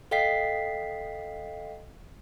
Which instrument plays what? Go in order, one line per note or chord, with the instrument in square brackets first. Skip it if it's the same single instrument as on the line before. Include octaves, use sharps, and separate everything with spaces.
[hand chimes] A4 D#5 F5 G5 B6 C7